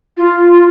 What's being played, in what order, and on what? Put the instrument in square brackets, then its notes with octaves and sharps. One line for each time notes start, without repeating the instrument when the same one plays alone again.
[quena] F4